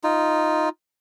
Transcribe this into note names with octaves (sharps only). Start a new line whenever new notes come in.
D#4 F4